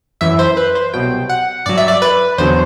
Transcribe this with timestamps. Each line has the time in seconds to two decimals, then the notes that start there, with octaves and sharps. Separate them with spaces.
0.21 F#2 E3 E5
0.39 C5
0.57 B4
0.75 C5
0.94 C2 B2 F#3 G5
1.29 F#5
1.66 G2 F#3 D5
1.77 E5
1.88 D5
2.02 B4
2.38 E2 D3 F#3 C5